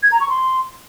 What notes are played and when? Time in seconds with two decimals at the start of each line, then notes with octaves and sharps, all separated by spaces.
0.03 G#6
0.12 A#5
0.21 C#6
0.29 C6